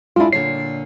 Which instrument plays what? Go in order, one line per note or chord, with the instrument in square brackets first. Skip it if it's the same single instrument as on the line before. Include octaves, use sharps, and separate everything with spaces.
[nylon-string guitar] G#3 D4 [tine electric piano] E4 F4
[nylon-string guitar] A#2 D3 C#5 [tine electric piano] C7